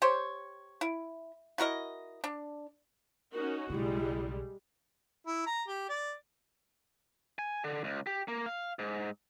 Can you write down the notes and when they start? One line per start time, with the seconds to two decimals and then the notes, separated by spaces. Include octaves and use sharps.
0.02 G4 C5 C#5
0.81 E4
1.58 E4 F#4 A#4 D#5
2.24 D4
3.33 C#4 D#4 F#4 A#4
3.70 B1 C#3 G3 G#3 E4
5.26 E4
5.46 A#5
5.68 G4
5.89 D5
7.39 G#5
7.64 D3
7.84 C#2
8.07 G4
8.28 A#3
8.46 F5
8.79 G#2